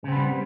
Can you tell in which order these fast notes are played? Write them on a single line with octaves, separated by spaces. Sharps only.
C#3 C4 B3 G3